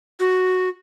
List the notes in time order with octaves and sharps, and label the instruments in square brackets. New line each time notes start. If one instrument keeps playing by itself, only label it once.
[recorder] F#4